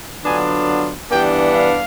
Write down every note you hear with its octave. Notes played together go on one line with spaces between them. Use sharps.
D3 F#3 B3 D4 F4 G#5
G2 E3 G3 B3 D4 G5
F5